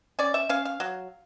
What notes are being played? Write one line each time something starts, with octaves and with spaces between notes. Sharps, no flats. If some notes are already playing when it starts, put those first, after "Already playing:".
C#4 D5
E5
C#4 F5
F5
F#3